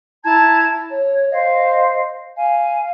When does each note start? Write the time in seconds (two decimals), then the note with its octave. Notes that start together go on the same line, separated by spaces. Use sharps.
0.24 E4 A5 A#5 G#6
0.90 C#5
1.32 C5 D#5 F5
2.37 F5 G#5